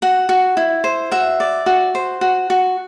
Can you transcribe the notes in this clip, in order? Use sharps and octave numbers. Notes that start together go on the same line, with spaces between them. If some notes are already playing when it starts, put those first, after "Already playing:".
F#4 F#5
F#4
E4
C5
F#4 E5
D5
F#4
C5
F#4
F#4